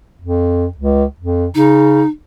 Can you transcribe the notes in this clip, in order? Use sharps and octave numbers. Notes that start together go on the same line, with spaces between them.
F2
C#2
F2
C#3 D#4